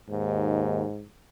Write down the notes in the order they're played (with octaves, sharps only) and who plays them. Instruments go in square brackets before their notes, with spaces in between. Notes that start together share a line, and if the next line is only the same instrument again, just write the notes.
[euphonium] D#2 [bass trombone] G#2